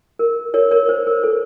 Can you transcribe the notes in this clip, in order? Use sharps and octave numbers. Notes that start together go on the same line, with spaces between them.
A#4
A#4 C#5
A#4 C#5
C5
A#4
A4